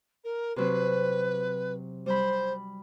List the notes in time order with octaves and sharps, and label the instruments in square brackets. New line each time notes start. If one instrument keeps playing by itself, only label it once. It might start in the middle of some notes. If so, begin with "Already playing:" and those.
[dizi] A#4
[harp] C3 F#3 C4 [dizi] B4
[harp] G3 B5 [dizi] C5